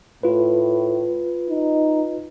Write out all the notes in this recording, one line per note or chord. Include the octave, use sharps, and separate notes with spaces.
A2 F4 B4
D#4